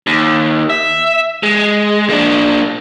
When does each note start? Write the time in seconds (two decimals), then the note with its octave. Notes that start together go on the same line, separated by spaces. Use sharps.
0.07 D#2
0.70 E5
1.43 G#3
2.09 A#3 D4